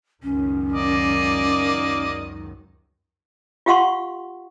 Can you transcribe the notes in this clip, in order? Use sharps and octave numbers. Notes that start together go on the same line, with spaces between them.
C#2 F#2 D#3 C#4
A#3 D5 D#5
F4 G4 F5 F#5 C6 C#6